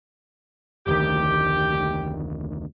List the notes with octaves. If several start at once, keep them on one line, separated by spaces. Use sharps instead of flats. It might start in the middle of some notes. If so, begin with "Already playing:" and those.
F1 D2 D#3 G4